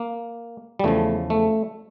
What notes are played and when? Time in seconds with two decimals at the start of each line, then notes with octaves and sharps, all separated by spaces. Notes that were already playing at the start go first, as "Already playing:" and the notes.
Already playing: A#3
0.79 G3
0.84 E2 C#3 F3 A3
1.30 A3